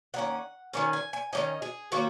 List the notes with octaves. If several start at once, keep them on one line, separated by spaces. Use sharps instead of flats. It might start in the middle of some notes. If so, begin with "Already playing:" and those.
D#3 A#3 C#4 F#5
D#3 A#3 C#4 G#5
G#5
G#5
D#3 A#3 C#4 D#5
G#4
D#3 A#3 C#4 F#4